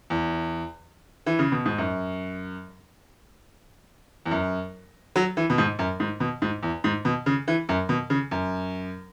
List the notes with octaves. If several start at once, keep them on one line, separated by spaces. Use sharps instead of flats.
E2
E3
C#3
B2
G#2
F#2
E2
F#2
F#3
E3
B2
G#2
F#2
G#2
B2
G#2
E2
G#2
B2
C#3
E3
F#2
B2
C#3
F#2